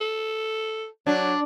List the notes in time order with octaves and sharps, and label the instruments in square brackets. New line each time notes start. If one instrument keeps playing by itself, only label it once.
[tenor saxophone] A4
[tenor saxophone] F#3 [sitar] D4